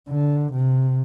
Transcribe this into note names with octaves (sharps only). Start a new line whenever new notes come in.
D3
C3